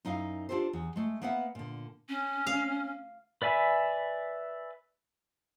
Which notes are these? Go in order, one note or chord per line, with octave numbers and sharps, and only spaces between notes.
F#2 D#4 E4 F5
D4 F4 G4 A4 C5
E2
G#3 A3
A#3 B3 B4 E5 F#5
A#2 D3
C#4
F5
B4 D5 E5 G#5 B5